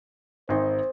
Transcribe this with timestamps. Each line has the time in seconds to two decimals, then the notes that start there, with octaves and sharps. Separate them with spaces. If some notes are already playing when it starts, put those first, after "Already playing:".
0.49 G#1 D#4 C5 C6